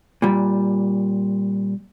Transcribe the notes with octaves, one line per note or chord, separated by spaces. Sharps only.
A#2 G3